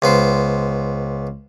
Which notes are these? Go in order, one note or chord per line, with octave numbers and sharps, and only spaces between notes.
C#2 B3 C5